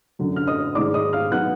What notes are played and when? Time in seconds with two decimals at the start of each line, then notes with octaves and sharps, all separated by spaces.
0.19 F#2 D3 F#3
0.36 F6
0.47 D#5 D#6
0.75 G#2 D#3 G#3 D#4 D5 D6
0.94 D#5 D#6
1.13 F5 F6
1.31 F#3 B3 D#4 F#5 F#6